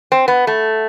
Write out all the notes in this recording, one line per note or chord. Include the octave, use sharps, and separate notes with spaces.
C4
B3
A3